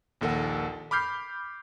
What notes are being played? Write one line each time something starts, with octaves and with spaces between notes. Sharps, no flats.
A#1 D#2 A4 A#4 F#5
B5 D6 F6 G6 C7